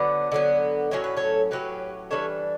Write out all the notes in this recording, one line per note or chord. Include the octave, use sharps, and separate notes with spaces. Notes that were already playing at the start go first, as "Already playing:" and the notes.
Already playing: D3 F#3 B3 B4 D5
D3 F#3 B3
A2 F#3 C#4 C#5
B4
A4 C#5
A2 F#3 C#4 G4 B4
E3 G3 D4 A4 C#5